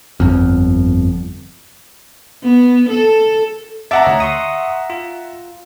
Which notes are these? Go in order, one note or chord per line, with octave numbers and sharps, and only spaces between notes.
G1 F2
B3
A4
E5 F#5 A5 A#5 D6
D2 C#5 D#5
C6 C#6 D#6
F4